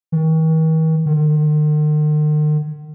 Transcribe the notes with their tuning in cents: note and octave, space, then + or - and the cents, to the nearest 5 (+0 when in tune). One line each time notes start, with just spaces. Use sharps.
D#3 +45
D#3 -45